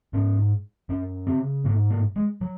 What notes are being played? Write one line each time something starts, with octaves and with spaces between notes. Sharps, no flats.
G#2 C#4
F#2 C#4
C#3 C4
G#2 A#3
A#3
G#3
F#3